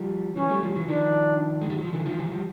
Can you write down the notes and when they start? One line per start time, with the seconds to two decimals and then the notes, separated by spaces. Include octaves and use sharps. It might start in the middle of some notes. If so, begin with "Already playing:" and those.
Already playing: F3 G3
0.36 E3 F#3 C#4
0.50 G3 A3
0.63 F3 G3
0.75 E3 F#3
0.89 D#3 F3 D4
1.61 G#3
1.70 G3
1.77 F#3
1.85 F3
1.93 D3 E3
2.05 D#3 F3
2.19 E3 F#3
2.32 F3 G3